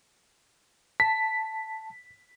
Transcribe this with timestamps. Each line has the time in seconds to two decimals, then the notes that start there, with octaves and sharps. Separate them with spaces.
1.00 A5 B6